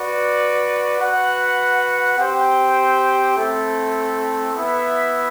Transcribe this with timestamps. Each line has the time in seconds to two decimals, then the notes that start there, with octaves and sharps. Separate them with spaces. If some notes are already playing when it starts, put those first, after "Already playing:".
Already playing: F#4 B4 D5
1.00 F#4 B4 F#5
2.18 C4 G4 C5 G5
3.36 A3 C4 E4 A4
4.54 B3 E4 B4 E5